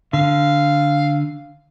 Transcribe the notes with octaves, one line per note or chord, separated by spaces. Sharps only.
D3 F5